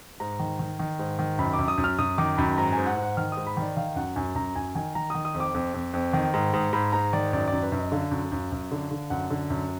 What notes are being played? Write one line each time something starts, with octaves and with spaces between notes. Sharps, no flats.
G#2 A#5
D#3
D#3
D#3
G#2
D#3
F#2 B5
D6
F#2
D#6
F#2
F6
F#2 D#6
D#3 D6
F#2 B5
G#2 A#5
G#2 G#5
F#5
G#2
F#5
D#3 F6
G#2 D#6
B5
D#3
D5
D#3 F5
F#2 F#5
F#2 G#5
F#2 A#5
F#2 G#5
D#3 G#5
D#3 A#5
D#3 D#6
D#6
F2
D6
F2
F2
F2
D#3
G#2
G#2
G#2 B5
G#2 A#5
D#3 D5
F#2 D5
F#2 D5
B4
F#2
D#5
D3 F5
F#2
F#2
F#2
D3
D3
F#2 F#5
D3
F#2